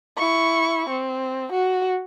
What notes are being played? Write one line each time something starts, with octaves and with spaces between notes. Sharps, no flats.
E4 C#6
C4
F#4